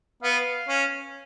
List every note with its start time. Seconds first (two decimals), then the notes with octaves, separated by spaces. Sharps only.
0.23 B3 F5
0.69 C#4